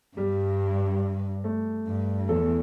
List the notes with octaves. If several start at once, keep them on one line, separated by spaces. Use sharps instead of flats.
G2 G3
A3
G2
E2 A4